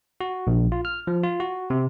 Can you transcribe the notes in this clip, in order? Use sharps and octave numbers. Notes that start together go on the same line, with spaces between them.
F#4
A#1
F4
F6
F3
F4
F#4
C3